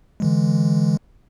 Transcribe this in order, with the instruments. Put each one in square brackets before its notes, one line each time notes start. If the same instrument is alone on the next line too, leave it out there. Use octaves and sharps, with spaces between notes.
[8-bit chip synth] D3 E3 G#3